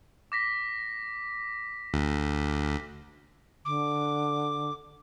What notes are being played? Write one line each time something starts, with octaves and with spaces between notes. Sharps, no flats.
D6 A#6 B6
D2
D3 D6